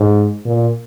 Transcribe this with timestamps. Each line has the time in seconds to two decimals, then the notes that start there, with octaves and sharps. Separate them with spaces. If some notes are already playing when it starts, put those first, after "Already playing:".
Already playing: G#2
0.45 A#2